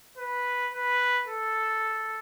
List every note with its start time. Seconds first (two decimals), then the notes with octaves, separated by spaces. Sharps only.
0.18 B4
0.72 B4
1.27 A4